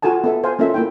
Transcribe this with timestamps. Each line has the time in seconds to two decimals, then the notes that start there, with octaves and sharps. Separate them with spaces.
0.02 F4 F#4 A4 G#5 A5
0.24 B3 A4 E5
0.44 C5 F5 G#5
0.59 A#3 C#4 F4 A4 E5
0.74 A#3 E4 G5